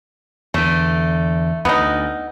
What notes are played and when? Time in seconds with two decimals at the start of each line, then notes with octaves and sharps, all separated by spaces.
0.54 E2 D3 A3
1.65 D2 B3 D#4